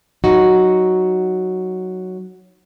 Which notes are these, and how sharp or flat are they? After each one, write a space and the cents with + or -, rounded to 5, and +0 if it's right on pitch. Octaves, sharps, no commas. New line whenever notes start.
F#3 +0 D#4 +0 F#4 +0